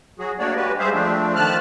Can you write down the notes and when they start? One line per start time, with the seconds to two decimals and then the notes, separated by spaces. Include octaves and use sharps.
0.19 F#3 F#4 G#4
0.39 A3 A#3 D4 F#4 C#5 D5
0.56 G#3 F#4 G4 B4
0.79 G3 G#3 G#4 C5 E5 F5
0.93 F3 A3 C4 D4
1.36 D#3 F3 A3 A5 F6 F#6